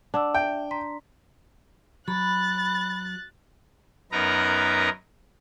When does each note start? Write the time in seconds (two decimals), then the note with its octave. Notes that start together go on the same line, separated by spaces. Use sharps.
0.14 D4 F#5 D6 E6
0.35 E5 G5
0.71 A#5 C6 B6
2.08 F#3 B5 F#6 A6
4.12 F#2 B3 D#4 A#4 B4 A#5